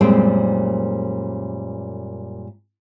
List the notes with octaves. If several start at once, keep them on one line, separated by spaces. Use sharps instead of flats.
F#2 A#2 G3 G#3 C4 G5